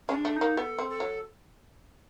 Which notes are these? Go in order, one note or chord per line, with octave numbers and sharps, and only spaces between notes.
G#3 C#4
D4
A3
D#4
A#3
B3 A4
C4
A4
F#3